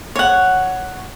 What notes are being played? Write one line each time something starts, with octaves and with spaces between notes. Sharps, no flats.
C#5 F#5